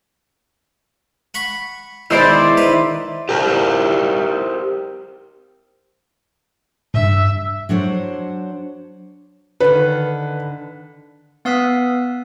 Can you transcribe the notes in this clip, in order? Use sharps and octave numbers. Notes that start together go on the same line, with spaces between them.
F#5 B5 C#6
B2 D#3 G#3 E4 C5 D5
D#3 B4
G4 A#4 C5
G2 E5
F#3 D4 C5 C#5
D3 D#3 B4
B3 F5 D#6 E6 F#6 B6